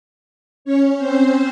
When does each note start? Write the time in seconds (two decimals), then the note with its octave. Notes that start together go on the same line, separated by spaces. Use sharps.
0.65 C#4 C#5
0.98 C4 C5